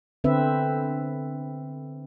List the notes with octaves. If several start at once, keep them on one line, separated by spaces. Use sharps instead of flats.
D3 C4 B4 E5